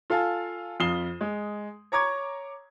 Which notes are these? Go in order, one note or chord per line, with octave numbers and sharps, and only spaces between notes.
F4 A4 F5 G#5 A5
F2 F4 D#6 C7 E7 G7
G#3
C#5 A#5 C#6 D6 G#6